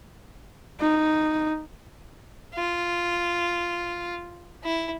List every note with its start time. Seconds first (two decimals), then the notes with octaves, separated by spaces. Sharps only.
0.81 D#4
2.54 F4
4.64 E4